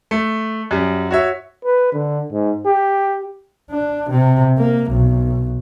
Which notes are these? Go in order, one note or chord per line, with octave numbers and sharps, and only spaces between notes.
A3
F#2 G3
F#4 C#5 E5
B4
D3
G#2
G4
D4
C3
A#3
B1